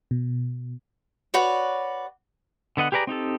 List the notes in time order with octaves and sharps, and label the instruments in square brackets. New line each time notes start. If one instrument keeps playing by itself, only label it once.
[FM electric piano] B2
[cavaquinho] F#4 B4 C#5 D5
[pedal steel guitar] D3 B3 D#5 F#5
G4 G#4 B4 D5 A#5
C4 D#4 G4 A4